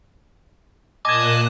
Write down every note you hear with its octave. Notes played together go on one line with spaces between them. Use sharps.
A#2 D#5 G#5 A5 D6 F#6 G#6